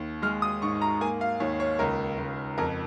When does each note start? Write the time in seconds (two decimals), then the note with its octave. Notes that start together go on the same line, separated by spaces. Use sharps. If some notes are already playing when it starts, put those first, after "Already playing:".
Already playing: D#2
0.22 G#3 F6
0.42 D#6
0.62 G#2 C#6
0.81 A#5
1.01 A#3 G#5
1.21 F5
1.40 D#2 C#5
1.60 C#5
1.79 C#2 A#4
2.18 C#2
2.58 F2 A#4